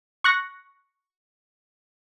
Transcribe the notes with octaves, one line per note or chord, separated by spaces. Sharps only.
C#6 F#6 A#6